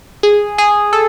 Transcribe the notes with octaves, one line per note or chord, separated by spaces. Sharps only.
G#4
G#4
A4